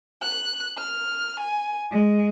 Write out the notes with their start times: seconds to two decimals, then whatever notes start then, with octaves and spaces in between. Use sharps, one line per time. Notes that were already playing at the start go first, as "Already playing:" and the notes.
0.22 F#6
0.77 F6
1.39 G#5
1.89 G#3